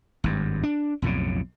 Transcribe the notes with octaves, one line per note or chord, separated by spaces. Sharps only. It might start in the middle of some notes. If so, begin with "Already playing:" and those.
G#1 G2
D4
B1 F2 A2 C#3